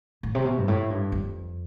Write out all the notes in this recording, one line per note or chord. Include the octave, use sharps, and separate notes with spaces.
A2
C3
B2
G2
A2
G2
F2